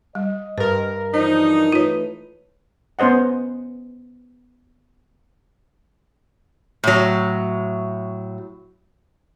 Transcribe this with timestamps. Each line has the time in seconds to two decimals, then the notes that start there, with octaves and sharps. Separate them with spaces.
0.15 G3 D#5
0.58 G2 A#4 B4
1.14 E3 F3 D4 D#4 C5
1.72 E3 A3 F4 B4 C#5
2.99 B3 C#4 C5 D#5 F#5
6.84 A2 F#3